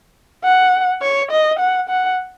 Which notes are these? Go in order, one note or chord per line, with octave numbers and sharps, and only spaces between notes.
F#5
C#5
D#5
F#5
F#5